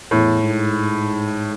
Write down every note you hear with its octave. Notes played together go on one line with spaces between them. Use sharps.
E2 A2
G#2